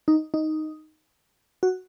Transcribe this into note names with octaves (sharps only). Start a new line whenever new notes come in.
D#4
D#4
F#4